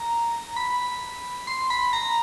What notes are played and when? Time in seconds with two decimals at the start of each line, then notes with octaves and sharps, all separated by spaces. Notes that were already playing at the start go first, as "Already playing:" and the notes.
Already playing: A#5
0.56 B5
1.47 C6
1.70 B5
1.93 A#5